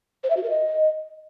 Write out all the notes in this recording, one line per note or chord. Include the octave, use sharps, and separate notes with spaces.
C5
E5
F#4
A#4
D#5